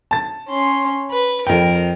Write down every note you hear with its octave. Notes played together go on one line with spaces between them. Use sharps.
A5 A6
C#4 C6
B4
F2 A#4 G5